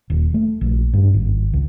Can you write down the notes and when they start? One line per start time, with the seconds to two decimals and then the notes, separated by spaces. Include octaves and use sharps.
0.10 D#1
0.34 A3
0.61 A#1
0.93 G2
1.14 G#1
1.53 C#2